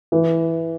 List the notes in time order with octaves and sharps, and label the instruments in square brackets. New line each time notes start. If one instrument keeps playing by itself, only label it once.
[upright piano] E3